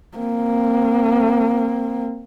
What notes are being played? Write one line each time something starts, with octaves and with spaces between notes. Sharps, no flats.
A#3 C4